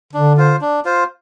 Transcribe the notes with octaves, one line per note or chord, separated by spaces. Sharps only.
D3 D4
F4 C5
D4
F4 C5